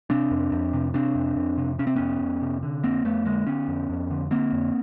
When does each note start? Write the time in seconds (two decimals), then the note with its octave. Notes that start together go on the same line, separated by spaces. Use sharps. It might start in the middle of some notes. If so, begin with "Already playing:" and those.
0.10 C3 C4 D4
0.31 F2
0.52 F2
0.73 C3
0.94 C3 C4 D4
1.15 F2
1.36 F2
1.58 C3
1.79 C3 C#4
1.87 C4
1.96 F2 B3 C#4
2.20 F2
2.42 C3
2.63 D3
2.84 F2 A#3 C4
3.04 F2 A3 B3
3.25 D3 G#3 A#3
3.47 D3 B3 C#4
3.68 F2
3.89 F2
4.10 D3
4.31 D3 A#3 C4
4.53 F2